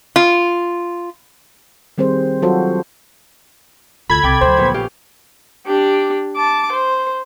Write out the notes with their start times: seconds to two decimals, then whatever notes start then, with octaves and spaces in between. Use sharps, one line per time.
0.16 F4
1.98 D#3 G3 C4 G#4 C5
2.42 F#3 F4 F#4 A4 C5
4.10 D2 F4 A4 B5 G#6
4.23 C2 G5 D6 A6
4.41 D2 F#3 C5
4.58 A#1 B3
4.74 C#4 G4 F5
5.67 D4 G4
6.36 A5 D6
6.72 C5